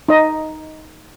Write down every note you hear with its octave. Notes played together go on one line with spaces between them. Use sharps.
D#4 D#5